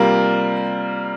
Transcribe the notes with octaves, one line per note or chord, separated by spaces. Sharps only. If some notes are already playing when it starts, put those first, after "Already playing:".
Already playing: C3 G3 A#3 F4 A#4